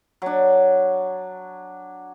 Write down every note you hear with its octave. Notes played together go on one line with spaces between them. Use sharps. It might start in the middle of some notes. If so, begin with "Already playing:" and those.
F#3 D4